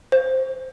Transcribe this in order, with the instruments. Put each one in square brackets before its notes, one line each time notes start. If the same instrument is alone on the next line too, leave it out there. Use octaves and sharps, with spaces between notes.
[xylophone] C5